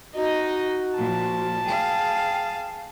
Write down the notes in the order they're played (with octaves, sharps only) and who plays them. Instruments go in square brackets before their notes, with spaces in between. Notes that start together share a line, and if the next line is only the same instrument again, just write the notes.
[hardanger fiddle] D#4 D#5 [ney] F#4
[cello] A#2 F3 [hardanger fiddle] A5
[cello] G#4 F5 [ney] G5